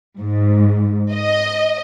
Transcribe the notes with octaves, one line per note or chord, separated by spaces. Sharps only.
G#2
D#5